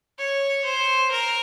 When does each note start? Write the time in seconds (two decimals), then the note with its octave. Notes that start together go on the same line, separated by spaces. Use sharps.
0.19 C#5
0.65 C5
1.11 A#4